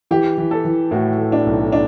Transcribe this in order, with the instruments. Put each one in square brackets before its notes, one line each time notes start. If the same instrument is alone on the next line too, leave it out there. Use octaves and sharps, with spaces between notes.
[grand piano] E3 [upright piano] G4
[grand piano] E3
[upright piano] A4
[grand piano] E3
[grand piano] A2 [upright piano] F#4
[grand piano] A3
[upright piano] D4
[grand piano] B1
[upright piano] D4